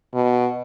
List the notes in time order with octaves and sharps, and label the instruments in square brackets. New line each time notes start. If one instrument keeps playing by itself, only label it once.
[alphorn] B2